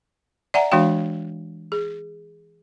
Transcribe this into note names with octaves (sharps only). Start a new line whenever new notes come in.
D5 E5 F#5 G#5 A#5
E3 G#3 D4 F#4 F5 G5
G#4